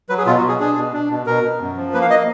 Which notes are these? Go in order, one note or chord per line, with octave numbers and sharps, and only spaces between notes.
F#3 B4
G#4
B2 F4
F#4
B2
G#4
D4 G#4
B2
D4
B2
B2 A#4
B2
F#2
F3
A#3 B4
F5
D#5